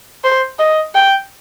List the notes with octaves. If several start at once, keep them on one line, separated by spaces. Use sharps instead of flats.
C5
D#5
G5